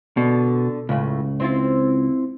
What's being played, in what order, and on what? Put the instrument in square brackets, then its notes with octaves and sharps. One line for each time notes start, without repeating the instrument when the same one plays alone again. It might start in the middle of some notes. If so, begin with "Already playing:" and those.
[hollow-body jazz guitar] B2 [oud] D3
[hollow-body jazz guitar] C#2 [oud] A2 C#3
[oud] C4 E4 F4